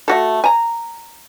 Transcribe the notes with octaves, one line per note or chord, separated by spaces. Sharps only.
A3 F#4 A4
G#5 A#5